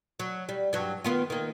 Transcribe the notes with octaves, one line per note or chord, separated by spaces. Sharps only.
F#3
G3
G2 F#3
D#3 B3 F4
D#3 A#3